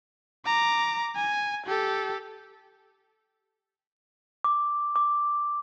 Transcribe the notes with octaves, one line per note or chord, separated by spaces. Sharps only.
A#5 D6
G#5
G4 A4
D6
D6